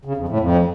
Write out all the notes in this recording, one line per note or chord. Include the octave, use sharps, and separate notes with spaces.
C#3
F2
A2
F2